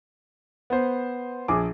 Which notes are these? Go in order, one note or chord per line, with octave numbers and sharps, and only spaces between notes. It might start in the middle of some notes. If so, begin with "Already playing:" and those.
B3 C5
A#1 G#4 D6